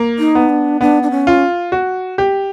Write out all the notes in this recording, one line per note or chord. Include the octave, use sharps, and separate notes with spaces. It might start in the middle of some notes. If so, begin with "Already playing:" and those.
Already playing: A#3
D#4
B3
D4
B3 D4
D4
C#4
F4
F#4
G4